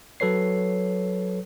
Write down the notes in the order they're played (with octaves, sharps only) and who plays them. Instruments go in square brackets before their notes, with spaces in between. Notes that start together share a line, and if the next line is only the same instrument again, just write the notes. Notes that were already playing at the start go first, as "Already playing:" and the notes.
[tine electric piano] F#3 A4 B4 C#5 C7